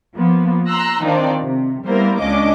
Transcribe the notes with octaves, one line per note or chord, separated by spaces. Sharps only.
F3 A#3 B3
A#5 C6 E6 F#6 A#6
D#3 C4 D4 D#4 F4 D5
C3
G3 A#3 B3 E4 A#4 C5
C#2 C#4 D4 D#5 D6